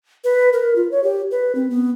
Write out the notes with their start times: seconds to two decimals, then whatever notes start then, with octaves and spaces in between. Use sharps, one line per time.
0.24 B4
0.53 A#4
0.76 F4
0.91 C#5
1.04 G4
1.31 B4
1.55 C4
1.70 B3